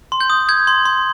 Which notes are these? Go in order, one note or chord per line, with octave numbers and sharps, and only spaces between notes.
C6
G6
D#6
G6 G#6
C6
C6